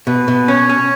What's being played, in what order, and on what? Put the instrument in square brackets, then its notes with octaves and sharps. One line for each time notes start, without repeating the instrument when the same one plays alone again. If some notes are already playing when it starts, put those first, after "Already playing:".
[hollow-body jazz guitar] B2 [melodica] B4
[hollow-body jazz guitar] B2
[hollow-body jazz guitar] C#4 [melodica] C#5
[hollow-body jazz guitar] C#4